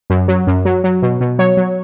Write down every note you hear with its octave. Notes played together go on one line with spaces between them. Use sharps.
F#2
F#3
F#2
F#3
F#3
B2
B2
F#3 C#5
F#3